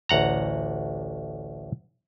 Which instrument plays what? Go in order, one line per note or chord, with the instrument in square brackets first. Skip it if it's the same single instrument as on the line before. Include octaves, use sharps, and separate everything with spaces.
[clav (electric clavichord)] A1 D2 F#5 A#5